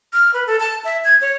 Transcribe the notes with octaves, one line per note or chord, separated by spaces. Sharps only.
F6
B4
A4
A5
E5
G#6
C#5